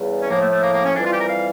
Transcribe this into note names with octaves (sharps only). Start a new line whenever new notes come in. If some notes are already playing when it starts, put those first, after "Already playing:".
Already playing: E2 C#3 G3
C#4
A2 F3 A#3
A3
A3
A#3
A#3
C#4
F2 E3 G3 D4
F4
G4
A#4
F5